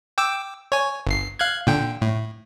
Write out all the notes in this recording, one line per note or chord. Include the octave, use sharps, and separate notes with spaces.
G5 D6 E6
C#5 G#5
G1 C7
F5 F#6 G#6
A#2 D3 G5
A2